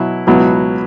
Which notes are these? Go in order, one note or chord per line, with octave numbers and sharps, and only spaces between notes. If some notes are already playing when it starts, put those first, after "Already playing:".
Already playing: B2 F#3 E4
C#2 B2 F#3 B3 E4